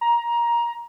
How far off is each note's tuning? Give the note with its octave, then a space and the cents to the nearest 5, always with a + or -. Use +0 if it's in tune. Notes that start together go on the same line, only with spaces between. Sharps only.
A#5 +15